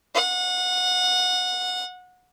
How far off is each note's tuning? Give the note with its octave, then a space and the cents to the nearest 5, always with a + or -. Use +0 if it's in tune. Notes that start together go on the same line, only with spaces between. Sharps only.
F#5 -25